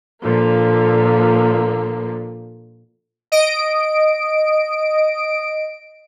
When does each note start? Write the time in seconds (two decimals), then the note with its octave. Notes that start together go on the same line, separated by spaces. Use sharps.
0.21 A#2 D3 F3 A#3
3.32 D#5 D7